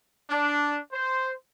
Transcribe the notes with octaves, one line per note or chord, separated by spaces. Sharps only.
D4
C5